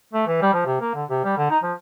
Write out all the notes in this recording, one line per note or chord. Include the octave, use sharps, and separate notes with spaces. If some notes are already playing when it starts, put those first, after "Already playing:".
A3
E3
G3
F3
C3
A#3
D3
C3
G3
D3
D#4
F3